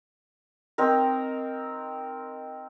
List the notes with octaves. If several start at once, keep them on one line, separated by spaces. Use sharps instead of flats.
C4 D#4 A#4